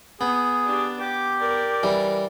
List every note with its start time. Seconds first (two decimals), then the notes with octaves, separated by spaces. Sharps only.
0.21 B3 G#4
0.66 D4 G4
1.01 G4 D6
1.39 A#4 D5
1.83 E3 G3